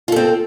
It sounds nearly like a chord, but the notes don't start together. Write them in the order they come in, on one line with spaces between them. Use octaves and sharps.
F4 A4 C4